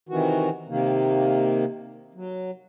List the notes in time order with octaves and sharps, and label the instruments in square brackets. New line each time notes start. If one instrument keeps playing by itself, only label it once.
[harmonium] C3 D#3 E3 F#4
C3 D#3 A#3
F#3